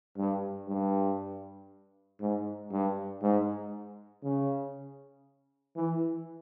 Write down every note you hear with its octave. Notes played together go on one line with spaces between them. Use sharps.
G2
G2
G#2
G2
G#2
C#3
E3